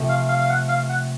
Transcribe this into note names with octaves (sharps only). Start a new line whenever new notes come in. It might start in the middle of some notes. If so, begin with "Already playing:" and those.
Already playing: C3 F3 A3 C4
F5
F5
F5
F#5
F5
F#5